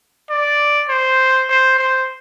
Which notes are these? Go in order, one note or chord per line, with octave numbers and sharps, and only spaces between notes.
D5
C5
C5
C5